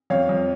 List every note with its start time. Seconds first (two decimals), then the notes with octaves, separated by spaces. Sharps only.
0.10 F2 C#5 F5
0.29 F2